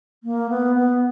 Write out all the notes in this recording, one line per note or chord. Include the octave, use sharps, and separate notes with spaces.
A#3
B3
B3